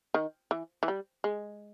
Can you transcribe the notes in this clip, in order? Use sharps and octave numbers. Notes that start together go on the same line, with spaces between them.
D#3
E3
E3
G3
G#3